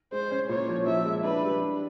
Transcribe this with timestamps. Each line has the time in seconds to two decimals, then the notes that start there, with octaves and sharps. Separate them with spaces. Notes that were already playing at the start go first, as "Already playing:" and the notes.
0.12 G#3 C5
0.31 C#4
0.49 A#2 C#5
0.68 F3
0.87 F3 E5
1.06 G#3
1.24 D4 B4
1.43 G3
1.61 D4